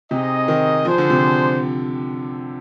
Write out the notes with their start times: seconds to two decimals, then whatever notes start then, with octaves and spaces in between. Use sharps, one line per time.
0.10 C3 C4 D#4 G#4 D#5
0.48 D#3
0.85 F3 D4 G#4 C5
0.98 D3
1.10 C3